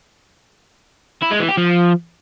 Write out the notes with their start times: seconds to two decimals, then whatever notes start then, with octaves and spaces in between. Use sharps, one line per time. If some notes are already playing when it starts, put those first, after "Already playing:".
1.23 E4
1.31 G#3
1.40 E3
1.49 G4
1.57 F3